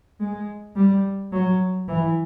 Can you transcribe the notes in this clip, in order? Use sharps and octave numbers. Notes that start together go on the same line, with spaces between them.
G#3
G3
F#3
E3